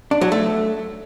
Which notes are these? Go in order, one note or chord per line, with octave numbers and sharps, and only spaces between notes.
D4
F#3
A3